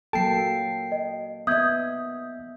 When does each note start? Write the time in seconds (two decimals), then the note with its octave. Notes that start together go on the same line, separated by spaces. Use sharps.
0.13 F#3 A#3 A4 G5 A5 C7
0.92 D#5
1.47 B3 D#5 E5 D#6 G6 G#6